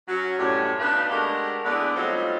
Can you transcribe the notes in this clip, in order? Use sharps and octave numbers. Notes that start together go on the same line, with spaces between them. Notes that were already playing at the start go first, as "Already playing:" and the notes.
F#3 C#4 F#4
F#2 A2 C3 G3 C#4
B2 D4 D#4 B4 F5
G#3 A3 D4 G4 A#4 F#5
D3 B3 D4 E4 G#4 D5
F#3 G3 A3 C4 D#4 F4